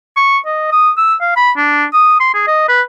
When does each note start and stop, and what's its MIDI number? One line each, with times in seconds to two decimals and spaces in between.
0.17 0.38 85
0.46 0.72 75
0.72 0.90 87
0.98 1.15 88
1.21 1.35 77
1.37 1.51 83
1.57 1.85 62
1.93 2.17 87
2.20 2.34 84
2.34 2.45 68
2.47 2.68 75
2.69 2.82 71